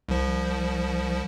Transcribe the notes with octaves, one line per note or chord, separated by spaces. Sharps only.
C2 F3